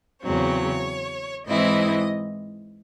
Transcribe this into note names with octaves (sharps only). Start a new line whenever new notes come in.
E2 C#3 F#3 C4 C#5
G#2 E3 C4 E4 D#5